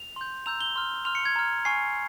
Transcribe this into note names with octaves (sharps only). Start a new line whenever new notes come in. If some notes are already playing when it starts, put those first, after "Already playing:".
Already playing: F7
C6 G6
A#5 E6 G6 F7
G7
C6 F6
C6 F6 F7
C#7
G#6
A#5 F6
G#5 C#6 F6 C7